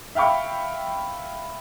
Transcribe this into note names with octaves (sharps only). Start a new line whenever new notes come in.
E5 F5 G5 B5 C#6